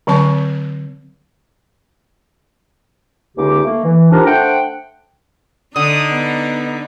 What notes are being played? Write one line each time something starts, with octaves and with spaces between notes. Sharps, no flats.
D3 F#3 C4 A5 C#6
C#2 D3 A#3 D#4 G4 D6
A3 A#3
E3
C4 D4 D#4 F4 G4 A#4
A3 D4 C5 F#5 G5
D3 D4 D#4 D#6
B3